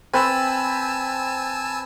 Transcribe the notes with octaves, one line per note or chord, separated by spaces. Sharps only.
C4 B4 G#5 A5 E6